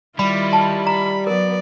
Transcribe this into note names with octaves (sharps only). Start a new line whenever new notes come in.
D#3 G3 E4 F4 B5
A5
A#5 B5
F#3 B3 A#4 D5